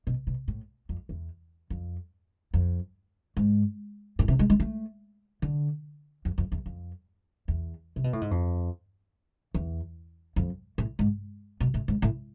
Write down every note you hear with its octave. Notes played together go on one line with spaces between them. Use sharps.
B2
B2
A2
F2
E2
F2
F2
G#2
A2
C3
G#3
G#3
A3
D3
F2
F2
E2
F2
E2
C3
B2
A2
G#2
F2
E2
F2
A2
G#2
B2
A2
G#2
A2